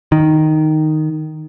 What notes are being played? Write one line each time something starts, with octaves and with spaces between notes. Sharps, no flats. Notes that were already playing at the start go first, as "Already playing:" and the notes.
D#3